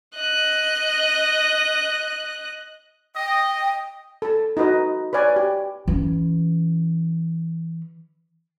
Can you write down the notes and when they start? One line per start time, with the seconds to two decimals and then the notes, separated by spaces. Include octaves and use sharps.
0.15 D#5 F#6
3.16 D#5 G5
4.22 A4 A5
4.57 D#4 F#4 B4 D#5
5.13 B4 C#5 D5 G#5
5.36 G4
5.88 E3 C#4